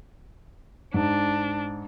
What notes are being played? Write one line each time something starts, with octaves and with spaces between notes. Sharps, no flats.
G#2 D4